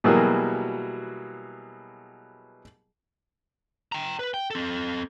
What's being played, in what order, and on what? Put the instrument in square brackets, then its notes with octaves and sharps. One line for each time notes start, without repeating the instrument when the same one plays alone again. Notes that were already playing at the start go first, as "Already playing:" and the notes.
[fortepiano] B2 E3 F#3 G3 A#3 G#4
[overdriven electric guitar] G5 A#5
B4
G5
C4 A4